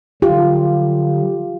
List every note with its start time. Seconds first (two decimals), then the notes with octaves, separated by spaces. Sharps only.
0.22 D3 F#3 F4 G4